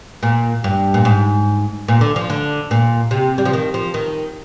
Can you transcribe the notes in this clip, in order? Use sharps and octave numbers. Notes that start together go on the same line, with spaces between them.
A#2
G2
A#2
G#2
A#2
D3
F3
D3
A#2
C3
G3
F3
D#3
F3
D#3